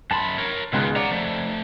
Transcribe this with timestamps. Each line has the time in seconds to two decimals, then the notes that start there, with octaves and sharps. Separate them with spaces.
0.11 F#2 A5 B5 C6
0.38 A#4 C#5
0.73 C#2 B2 D#3 G#3 F#6
0.96 D5 F#5 A#5
1.10 F3 A3